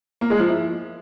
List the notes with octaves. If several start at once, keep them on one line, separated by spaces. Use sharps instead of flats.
A#3
G#3
F3
E4